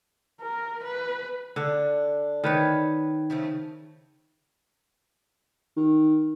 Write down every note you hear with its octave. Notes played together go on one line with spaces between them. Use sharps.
A#4
B4
D3 D4
D#3 B4 C#5
C#3 F3 A3
D#3